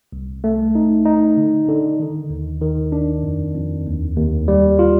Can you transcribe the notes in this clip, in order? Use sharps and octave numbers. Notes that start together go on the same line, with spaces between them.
C2
A3
D#4
D#4
D3
D3
D#3
D#2
D#3
D4
F2
F2
D#2
D#2
G3
F4